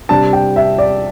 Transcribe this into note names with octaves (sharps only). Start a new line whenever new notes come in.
C3 G3 D4 A5
G5
E5
D5